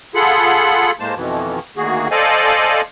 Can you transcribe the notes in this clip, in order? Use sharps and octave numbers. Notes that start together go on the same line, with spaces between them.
F4 G#4 A4 F#5 B5
A2 G#3 A#3 C5 A5
F2 B2 D#3 E3
D2 D#3 A#3 F#4 G#4
A4 C5 D5 D#5 F5 G#5